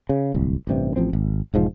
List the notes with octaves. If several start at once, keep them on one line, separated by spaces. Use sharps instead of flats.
C#3
D1 C2
A1 G2 C3
A1 F3 C4
G#1
E1 G#2 F3